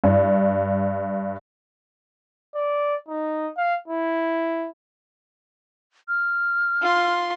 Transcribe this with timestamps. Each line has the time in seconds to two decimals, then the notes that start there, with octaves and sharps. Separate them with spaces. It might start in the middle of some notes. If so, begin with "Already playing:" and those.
0.04 G2
2.55 D5
3.09 D#4
3.57 F5
3.88 E4
6.08 F6
6.81 F4 C6